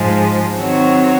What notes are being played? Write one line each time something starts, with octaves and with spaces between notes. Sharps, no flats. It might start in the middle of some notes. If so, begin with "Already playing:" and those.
Already playing: G#2 F3 G#3
D#3 F#3 C4 F#4 C#5